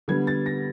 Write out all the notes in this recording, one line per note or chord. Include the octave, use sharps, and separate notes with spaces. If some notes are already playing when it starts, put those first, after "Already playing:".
D3 G3 B3 G#6
A6
A#6